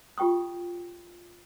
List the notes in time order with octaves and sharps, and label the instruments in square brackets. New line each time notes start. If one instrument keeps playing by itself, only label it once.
[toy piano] F4 G4 G5 C#6 D#6